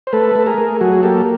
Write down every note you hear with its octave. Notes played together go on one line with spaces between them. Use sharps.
C5
A3 A4 B4
A3 A4
G#4 A#4
A3
F#3 F#4 G#4
A#3 G4 A4